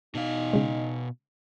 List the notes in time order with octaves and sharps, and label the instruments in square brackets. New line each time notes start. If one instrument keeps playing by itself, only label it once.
[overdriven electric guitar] B2 F5 [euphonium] D#4
[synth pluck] C#3 G#3